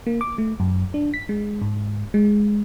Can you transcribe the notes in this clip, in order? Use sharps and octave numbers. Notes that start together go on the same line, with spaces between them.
A#3
D6
A3
F#2
D4
B6
G#3
G#2
G#3